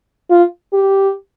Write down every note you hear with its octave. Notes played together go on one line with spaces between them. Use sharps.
F4
G4